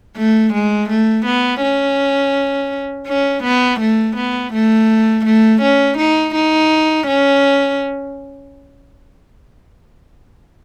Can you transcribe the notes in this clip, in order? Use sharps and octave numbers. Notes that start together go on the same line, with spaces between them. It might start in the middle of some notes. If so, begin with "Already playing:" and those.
A3
G#3
A3
B3
C#4
C#4
B3
A3
B3
A3
A3
C#4
D#4
D#4
C#4